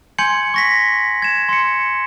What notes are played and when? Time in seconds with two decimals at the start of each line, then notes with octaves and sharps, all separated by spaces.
0.18 G#5 C6 G6 G#6 C#7 F#7
0.54 C#6 A#6 B6
1.22 G#6 E7
1.49 C6 C#7